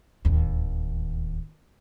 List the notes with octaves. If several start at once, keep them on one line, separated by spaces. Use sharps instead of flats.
D1 D#2